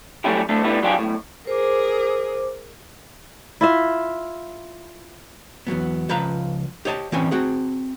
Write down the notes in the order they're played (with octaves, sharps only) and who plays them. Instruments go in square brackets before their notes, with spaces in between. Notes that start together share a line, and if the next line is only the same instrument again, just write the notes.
[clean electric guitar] F#3 G3 A3 C#4 E4 G4
D2 A2 A3 D4 A4
A2 D3 G3 B3 E4
F#3 G3 D4 F4 G4 G#4
B1 A2
[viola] G#4 A#4 [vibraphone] C5 D6
[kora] E4 F4 E5
[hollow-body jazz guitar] E2 G2 F#3 B3
C#2 F3 B4 F5 A#5
G4 C5 C#5 D#5 G#5 A5
E3 G3 C4 C#4 C#5 G#5
C4 F#4 G#4